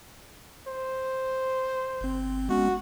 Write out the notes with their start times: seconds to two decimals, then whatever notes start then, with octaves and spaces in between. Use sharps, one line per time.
0.67 C5
2.01 G1 C4
2.49 G#3 B3 C#4 F#4